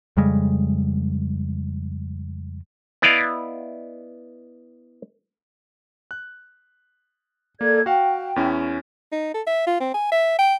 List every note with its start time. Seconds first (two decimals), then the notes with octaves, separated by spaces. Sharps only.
0.17 F2 C#3 G3 G#3
3.02 B3 E4 D5 D#5 F5
6.11 F#6
7.61 A#3 A4 D5 G#6
7.86 F#4 F5 G5
8.36 E2 C#4 E4
9.12 D#4
9.34 A4
9.47 E5
9.67 F4
9.80 C4
9.94 G#5
10.12 E5
10.39 G5